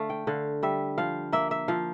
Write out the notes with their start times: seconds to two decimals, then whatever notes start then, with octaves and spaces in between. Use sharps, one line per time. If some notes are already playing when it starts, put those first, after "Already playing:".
Already playing: D3 A3 F5
0.10 G5
0.27 D3 F5
0.63 G3 E5
0.98 F3 F5
1.33 A#3 E5
1.51 E5
1.68 F3 F5